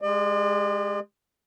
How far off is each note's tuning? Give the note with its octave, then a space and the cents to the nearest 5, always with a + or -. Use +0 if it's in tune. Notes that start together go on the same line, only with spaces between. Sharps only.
G#3 +0 G4 +25 D5 +45